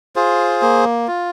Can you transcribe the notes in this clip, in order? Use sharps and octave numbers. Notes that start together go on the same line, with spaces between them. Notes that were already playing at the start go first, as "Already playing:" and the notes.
F4 G#4 C5
A#3
F4